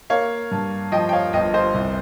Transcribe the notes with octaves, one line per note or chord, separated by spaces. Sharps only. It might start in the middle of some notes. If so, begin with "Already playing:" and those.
A#3 C#5 F5
G2
F3 D#5 G5
G5
C#5 F5
G1 D#5 G5
C5 D#5
C2